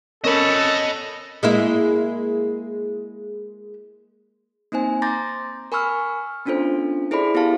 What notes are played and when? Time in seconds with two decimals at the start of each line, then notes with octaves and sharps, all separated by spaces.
0.24 C#4 A4 A#4 D#5 B5 E7
1.43 G#3 A#3 E4
4.72 A#3 C4 D#4 C5 G#5
5.02 A#5 C6 D6 G6 A6 A#6
5.72 A#4 G#5 B5 C#6 E6 F6
6.45 B3 C#4 D4 F4 A4 C5
7.11 E4 G#4 A4 C5 D5 B5
7.34 B3 E4 G4 A4 F5 A5